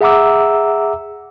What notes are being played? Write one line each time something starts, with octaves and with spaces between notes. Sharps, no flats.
G#4 E5 F#5 A#5 D6 E6